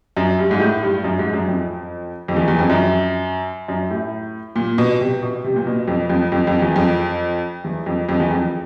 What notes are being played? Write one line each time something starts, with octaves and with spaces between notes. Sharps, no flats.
F#2
G2
G#2
A2
G2
F#2
G#2
F#2
F2
F2
E2
E2
F2
F#2
F#2
A2
A#2
B2
C3
B2
C3
A#2
B2
F2
F2
F2
F2
E2
F2
E2
F2
F2
E2
F2